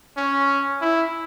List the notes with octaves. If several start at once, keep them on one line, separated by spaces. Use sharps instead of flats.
C#4
E4